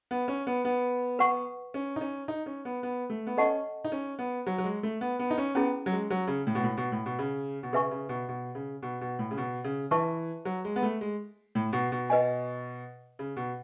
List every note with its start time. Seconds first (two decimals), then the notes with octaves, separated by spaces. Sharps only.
0.11 B3
0.28 C#4
0.47 B3
0.65 B3
1.19 B4 F#5 C#6
1.74 C#4
1.96 D#4
2.01 C#4
2.28 D#4
2.46 C#4
2.65 B3
2.83 B3
3.10 A3
3.27 B3
3.37 C#4 A4 D#5 F#5 A5 C#6
3.84 D#4
3.92 C#4
4.19 B3
4.46 F#3
4.58 F#3
4.64 G#3
4.83 A3
5.01 B3
5.19 B3
5.30 D#4
5.38 C#4
5.55 B3 C#4 E4 G#4
5.86 F#3
5.92 G#3
6.10 F#3
6.27 C#3
6.47 A2
6.55 B2
6.64 A2
6.77 B2
6.92 A2
7.06 B2
7.19 C#3
7.63 B2
7.73 C#3 G#4 B4 E5 G#5 C#6
7.91 C#3
8.09 B2
8.28 B2
8.55 C#3
8.83 B2
9.01 B2
9.19 A2
9.31 C#3
9.38 B2
9.64 C#3
9.91 E3 B4 E5 A5 C#6
10.45 F#3
10.65 G#3
10.76 B3
10.83 A3
11.01 G#3
11.55 A2
11.73 B2
11.92 B2
12.10 B4 D#5 G#5
13.19 C#3
13.37 B2